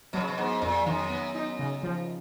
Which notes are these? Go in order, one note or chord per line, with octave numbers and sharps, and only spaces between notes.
B2 F#3
C#3
B2
G#2 B3
F2 A#2
F#2 D#3
B3
D#4
C#3
F3